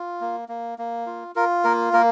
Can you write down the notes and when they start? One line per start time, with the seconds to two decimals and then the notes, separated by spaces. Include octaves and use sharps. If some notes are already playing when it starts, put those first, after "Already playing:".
Already playing: F4
0.21 A#3
0.49 A#3
0.79 A#3
1.07 F4
1.36 F4 A#4
1.64 A#3 A#4
1.93 A#3 A#4